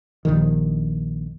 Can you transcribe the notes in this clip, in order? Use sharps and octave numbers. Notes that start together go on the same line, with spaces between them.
A#1 G2 D#3